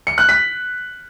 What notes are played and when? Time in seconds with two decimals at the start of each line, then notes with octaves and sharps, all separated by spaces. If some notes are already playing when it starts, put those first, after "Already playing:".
0.07 C#7
0.18 F#6
0.29 B6